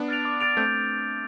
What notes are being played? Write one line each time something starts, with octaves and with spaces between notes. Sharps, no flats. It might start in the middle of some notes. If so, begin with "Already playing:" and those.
Already playing: B3 D4
F6 A6 D7 F7
D6
F6 A6 D7 F7
A3 C4 G6